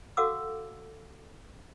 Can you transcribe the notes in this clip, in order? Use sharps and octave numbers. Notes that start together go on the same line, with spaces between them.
F#4 A4 F5 F#5 D6 E6